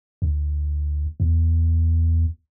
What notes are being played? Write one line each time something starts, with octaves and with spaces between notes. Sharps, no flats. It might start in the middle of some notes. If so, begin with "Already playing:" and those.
D2
E2